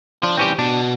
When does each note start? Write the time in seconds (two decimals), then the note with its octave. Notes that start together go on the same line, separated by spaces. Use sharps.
0.23 F3 D4
0.37 E3 G3 C4 C#4 G4
0.59 B2 D4